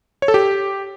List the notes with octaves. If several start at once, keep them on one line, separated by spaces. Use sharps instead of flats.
C#5
A4
G4